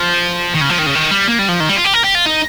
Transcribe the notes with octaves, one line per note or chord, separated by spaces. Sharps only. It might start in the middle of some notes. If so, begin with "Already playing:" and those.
Already playing: F3
D#3
C#3
F3
D#3
C#3
D#3
G3
A#3
G3
F3
D#3
G3
F4
G4
A#4
G4
F4
D#4